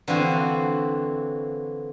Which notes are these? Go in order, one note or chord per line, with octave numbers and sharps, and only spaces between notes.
D3 E3 F3 C4 F#4